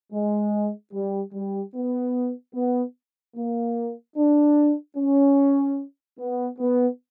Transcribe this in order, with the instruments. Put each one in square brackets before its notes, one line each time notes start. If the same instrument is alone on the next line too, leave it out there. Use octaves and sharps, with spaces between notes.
[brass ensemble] G#3
G3
G3
B3
B3
A#3
D4
C#4
B3
B3